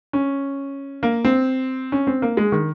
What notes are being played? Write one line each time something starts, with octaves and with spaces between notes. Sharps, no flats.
C#4
A#3
C4
C#4
C4
A#3
G#3
D#3